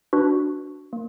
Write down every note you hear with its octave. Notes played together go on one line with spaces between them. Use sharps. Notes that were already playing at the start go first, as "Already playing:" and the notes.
D4 F#4 B4
A#3